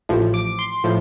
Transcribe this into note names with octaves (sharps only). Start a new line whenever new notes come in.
A1 A2 F3
D6
C6
A2 F3